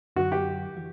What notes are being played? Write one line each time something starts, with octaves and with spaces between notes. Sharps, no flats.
F#2 D3 F#3 F#4
G4
E3